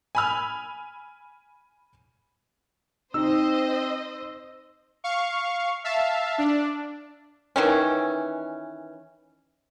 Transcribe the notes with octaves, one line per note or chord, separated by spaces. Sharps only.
G#5 B5 F6
C4 D#4 C5 D#5 E6
F5 C#6
E5 F5 A5
D4
D#3 E3 C#4